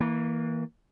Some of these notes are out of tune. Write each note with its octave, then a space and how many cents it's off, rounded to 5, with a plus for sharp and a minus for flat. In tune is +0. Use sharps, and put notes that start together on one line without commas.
E3 -25 A#3 +0